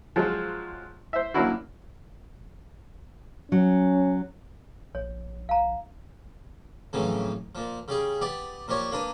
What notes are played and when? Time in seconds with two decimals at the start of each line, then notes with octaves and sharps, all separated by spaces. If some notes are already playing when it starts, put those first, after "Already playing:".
0.16 F3 F#3 G#3
1.13 C5 E5
1.34 F#3 A#3 C#4 D4 E4 F#4
3.52 F#3 C#4
4.95 A#1 C#5
5.49 F5 A#5
6.93 F2 A2 C#3 E3 F#3
7.55 A#2 F3
7.88 C#3 G3 G#4
8.22 B3 G4 D5
8.68 A#2 F3 G4 C#5
8.92 A#3 D4 B4 D#6